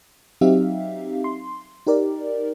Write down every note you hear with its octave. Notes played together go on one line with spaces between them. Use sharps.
F#3 C4 D#4 G4 E5 F5
C6
D#4 G4 A#4 D5